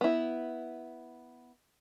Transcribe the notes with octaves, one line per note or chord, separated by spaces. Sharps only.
B3 E4